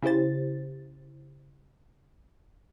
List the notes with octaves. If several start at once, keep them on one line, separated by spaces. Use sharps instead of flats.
C#3 E4 G4 C5 A6